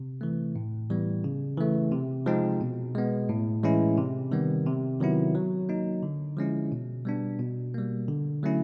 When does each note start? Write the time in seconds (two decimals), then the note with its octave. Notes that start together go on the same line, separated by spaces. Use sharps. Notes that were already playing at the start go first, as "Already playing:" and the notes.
Already playing: C3
0.21 E3 A3
0.56 A2
0.90 E3 G3 B3
1.24 C#3
1.57 E3 A3
1.92 C3
2.26 F3 G#3 C4 D#4
2.61 B2
2.95 G#3 B3
3.29 A2
3.64 E3 G#3 C#4 E4
3.98 C3
4.32 D#3 G3 B3
4.66 C3
5.00 D#3 F#3 B3 E4
5.35 F#3
5.69 A#3 D#4
6.03 D3
6.37 F3 G#3 C#4 E4
6.72 B2
7.05 G3 B3 D4
7.39 B2
7.74 G3 A#3
8.08 D3
8.43 F#3 A3 C#4 E4